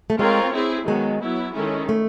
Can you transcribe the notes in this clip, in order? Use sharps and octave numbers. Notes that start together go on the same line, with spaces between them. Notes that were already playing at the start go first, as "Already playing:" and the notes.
A3
G#3 C4 F4 A#4 C#5
C4 E4 G#4
D#3 F#3 G#3 B3
F#3 B3 E4
D#3 G#3 C#4 E4 A4
A3